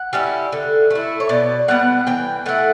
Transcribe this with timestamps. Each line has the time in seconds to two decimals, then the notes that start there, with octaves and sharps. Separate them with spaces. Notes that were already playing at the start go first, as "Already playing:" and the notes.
Already playing: F#5
0.13 G3 C#4 E4
0.52 D3
0.90 A3 E4
1.20 C#5
1.29 B2 D5
1.68 G3 B3 F#5
2.07 E3 G5
2.46 A3 E4 F#5